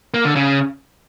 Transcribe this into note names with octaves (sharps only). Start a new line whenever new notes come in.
A#3
D3
C#3